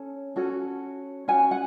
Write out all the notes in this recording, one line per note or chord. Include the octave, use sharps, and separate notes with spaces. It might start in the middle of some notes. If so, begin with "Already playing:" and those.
Already playing: C#4 A4
C#4 F#4 A4
C#4 F#4 G#5
F#5